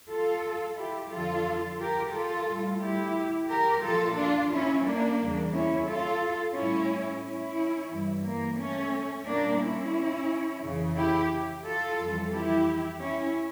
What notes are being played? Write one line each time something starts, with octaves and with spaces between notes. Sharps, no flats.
F4 A4
E4 G4
F2 D3 F3 F4 A4
G4 A#4
F4 A4
A2 G3
E4 G4
G4 A#4
A#2 F3 F4 A4
D4 F4
C#4 E4
A#3 D4
E2 C#3 G3
C#4 E4
F4 A4
A2 G3 C#4 E4
C#4 E4
G2 E3 G3
A#3
A3 C#4
A#2 G3 A#3 D4
C#4 E4
F2 C#3 E3
E4 G4
F4 A4
F2 E3 G3
E4 G4
C#4 E4